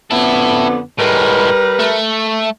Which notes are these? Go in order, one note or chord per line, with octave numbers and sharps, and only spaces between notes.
F2 D3 B3 E4 A4
A2 G3 G#3 A#4 B4
A3